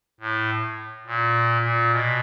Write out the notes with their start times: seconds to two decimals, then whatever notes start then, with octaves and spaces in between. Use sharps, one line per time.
0.20 A2
1.06 A#2
1.62 A#2
1.91 B2